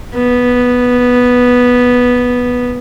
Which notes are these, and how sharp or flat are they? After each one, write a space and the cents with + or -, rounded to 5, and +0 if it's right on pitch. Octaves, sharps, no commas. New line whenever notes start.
B3 -5